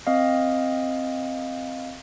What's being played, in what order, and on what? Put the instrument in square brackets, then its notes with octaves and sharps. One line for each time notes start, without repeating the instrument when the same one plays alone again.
[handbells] C4 D#5 F5